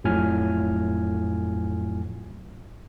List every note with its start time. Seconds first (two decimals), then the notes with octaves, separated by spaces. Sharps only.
0.04 F2 A2 F#3 F4 G#5 F6